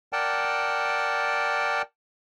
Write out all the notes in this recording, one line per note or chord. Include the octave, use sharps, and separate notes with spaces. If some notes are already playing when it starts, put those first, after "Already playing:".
A#4 D5 F#5 G5 A5